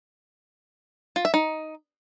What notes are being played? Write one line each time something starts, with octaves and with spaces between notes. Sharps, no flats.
F4
E5
D#4